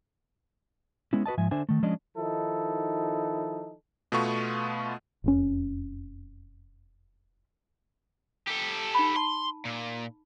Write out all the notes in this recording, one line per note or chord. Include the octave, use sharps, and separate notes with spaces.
G#3 B3 C#4 E4
F#4 B4 D#5 A5
G#2 F3 E5 G#5
D3 D4 C5 E5 G#5
D#3 A3
F3 G#3 C#4 D4 D#5
D#3 F3 D#4 E4 A4
B2 A3 B3 F4 C#6
E1 F2 C#4
G4 A4
D#4 B5
A5 C6
A#2